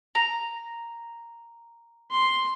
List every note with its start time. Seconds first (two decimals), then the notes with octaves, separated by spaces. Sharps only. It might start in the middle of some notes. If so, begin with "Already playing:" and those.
0.15 A#5
2.12 C6